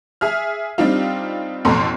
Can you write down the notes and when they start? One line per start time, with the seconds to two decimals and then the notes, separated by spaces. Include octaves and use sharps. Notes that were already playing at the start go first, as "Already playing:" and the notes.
0.21 G#4 E5 F6
0.78 G3 C4 D4 D#4 F4
1.65 A1 F2 B2 A4 A#5 C6